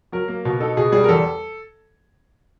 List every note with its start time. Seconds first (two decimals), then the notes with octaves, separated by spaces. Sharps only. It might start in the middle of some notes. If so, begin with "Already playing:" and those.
0.12 F#3 A#4
0.28 A#3
0.45 B2
0.60 D#4 A4
0.77 B2 G#4
0.92 G3 G#4
1.04 A#4
1.08 E2 A4